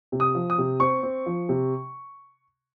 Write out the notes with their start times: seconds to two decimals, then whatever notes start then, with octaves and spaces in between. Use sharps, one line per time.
0.12 C3
0.20 D#6
0.35 F3
0.50 D#6
0.58 C3
0.80 C4 C#6
1.03 C4
1.26 F3
1.49 C3